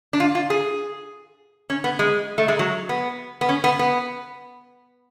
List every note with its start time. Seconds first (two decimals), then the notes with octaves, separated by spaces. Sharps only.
0.13 D4
0.20 F4
0.35 F4
0.50 G#4
1.70 C#4
1.84 B3
1.99 G#3
2.38 A3
2.48 G#3
2.59 F#3
2.89 B3
3.41 B3
3.49 C#4
3.64 B3
3.79 B3